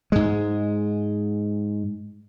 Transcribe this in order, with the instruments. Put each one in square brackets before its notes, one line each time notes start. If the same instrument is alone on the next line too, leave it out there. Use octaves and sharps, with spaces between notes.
[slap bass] G#2 G#3